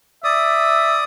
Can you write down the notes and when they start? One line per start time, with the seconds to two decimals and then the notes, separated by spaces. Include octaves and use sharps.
0.24 D5 E5 D#6